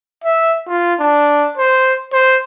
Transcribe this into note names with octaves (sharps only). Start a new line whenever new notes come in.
E5
F4
D4
C5
C5